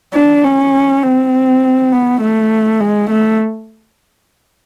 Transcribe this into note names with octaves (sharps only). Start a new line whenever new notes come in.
D4
C#4
C4
B3
A3
G#3
A3